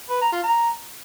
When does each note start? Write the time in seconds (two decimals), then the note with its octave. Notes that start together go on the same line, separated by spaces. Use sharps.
0.10 B4
0.21 A#5
0.32 F4
0.43 A#5